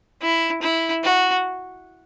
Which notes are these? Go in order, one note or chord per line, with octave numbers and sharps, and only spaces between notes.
E4
E4
F#4